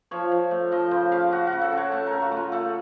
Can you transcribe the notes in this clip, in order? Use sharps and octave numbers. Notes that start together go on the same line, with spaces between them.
F3 C#5
F3
A3
F3 D#5
C#3 C5
C#3 F5
C#3 F#4
F#4
C#3
A4
C#3 C#5
A3 A5
A#4
C#3
F#4
A3 F4
A3 A4